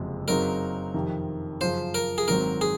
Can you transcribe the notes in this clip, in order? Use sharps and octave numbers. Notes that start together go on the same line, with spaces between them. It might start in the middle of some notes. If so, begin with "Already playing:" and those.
Already playing: F#1 F2 C3 F3 G#3
F#2 C#3 F#3 C4 D#4 A#4
F2 C3 D#3
F#2 C#3 F3 C5
A#4
G#4
G#1 G#2 D#3 F#3 C4 A#4
G#4